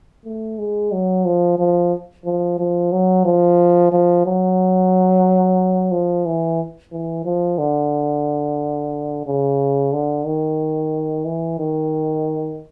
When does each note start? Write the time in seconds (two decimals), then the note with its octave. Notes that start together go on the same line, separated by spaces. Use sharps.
0.25 A3
0.59 G#3
0.92 F#3
1.25 F3
1.59 F3
2.25 F3
2.59 F3
2.92 F#3
3.25 F3
3.92 F3
4.26 F#3
5.92 F3
6.26 E3
6.92 E3
7.25 F3
7.58 D3
9.26 C#3
9.93 D3
10.26 D#3
11.25 E3
11.59 D#3